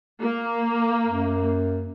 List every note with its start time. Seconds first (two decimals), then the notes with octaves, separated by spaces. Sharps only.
0.21 A#3
1.07 F#2